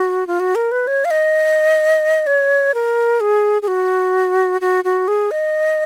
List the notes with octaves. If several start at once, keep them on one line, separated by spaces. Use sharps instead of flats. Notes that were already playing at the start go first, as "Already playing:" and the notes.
Already playing: F#4
F4
F#4
A#4
B4
C#5
F5
D#5
C#5
A#4
G#4
G#4
F#4
F#4
F#4
G#4
D#5